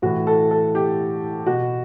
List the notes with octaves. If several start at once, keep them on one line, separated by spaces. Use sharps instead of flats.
A2 E3 F#4
A4
A4
G4
B2 F#4